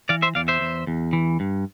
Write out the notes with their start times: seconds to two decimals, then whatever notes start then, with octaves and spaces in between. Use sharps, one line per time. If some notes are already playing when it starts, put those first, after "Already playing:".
0.09 E3 D5 F5
0.22 C5 E5
0.35 E2 D5 F5
0.48 C5 E5
0.61 E2
0.87 E2
1.13 E3
1.40 G2